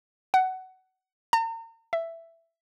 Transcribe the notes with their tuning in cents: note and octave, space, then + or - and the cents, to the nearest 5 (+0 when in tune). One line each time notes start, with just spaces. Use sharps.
F#5 +20
A#5 -40
E5 +10